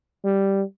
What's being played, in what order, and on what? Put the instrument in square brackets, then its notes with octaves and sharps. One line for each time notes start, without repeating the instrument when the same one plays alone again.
[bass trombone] G3